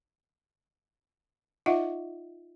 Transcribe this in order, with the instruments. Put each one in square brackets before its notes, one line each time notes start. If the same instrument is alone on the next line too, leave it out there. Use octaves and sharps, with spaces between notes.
[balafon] D#4 F4 D#5 E5 F#5